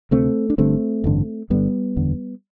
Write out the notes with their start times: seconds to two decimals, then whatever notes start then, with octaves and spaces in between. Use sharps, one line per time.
0.11 D2 C3 A3 C4
0.50 D4
0.58 G1 G2 D3 A3 C4
1.04 A1 G2 D3
1.50 G1 G2 D3 G3 B3
1.96 F#1 E2 D3